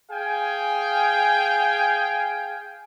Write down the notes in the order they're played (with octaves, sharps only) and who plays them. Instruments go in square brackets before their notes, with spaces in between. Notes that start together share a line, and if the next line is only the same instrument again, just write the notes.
[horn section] G#4 F5 G5 G#5